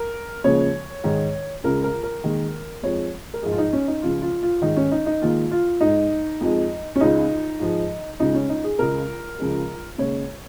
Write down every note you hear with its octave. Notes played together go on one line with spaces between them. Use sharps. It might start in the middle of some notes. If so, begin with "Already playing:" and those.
Already playing: A#4
D#2 C#3 F3 G#3 C#5
G#2 D#3 G#3
C#2 C#3 G#3 A#4
A#4
A#4
D#2 D#3 G#3
F2 F3 G#3 C#5
A#4
G#2 F3 G#3 G#4
F4
D#4
C#4
D#4
C#2 C#3 F3 F4
F4
F4
G#2 D#3 G#3 D#4
C#4
D#4
D#4
D#2 D#3 G#3 F4
F4
G#2 G#3 D#4
F2 F3 G#3
C#4
C#2 C#3 G#3 D#4
G#2 F3 G#3
C#2 C#3 G#3 D#4
C#4
D#4
G#4
C#2 C#3 G#3 A#4
C#2 C#3 F3 G#3
D#2 C#3 G#3 C#5